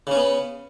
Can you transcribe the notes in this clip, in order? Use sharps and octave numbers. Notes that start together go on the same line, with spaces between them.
C#3 B3 C#4